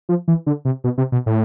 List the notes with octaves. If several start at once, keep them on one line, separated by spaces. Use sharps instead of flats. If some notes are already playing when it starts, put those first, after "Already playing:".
F3
E3
D3
C3
B2
C3
B2
A2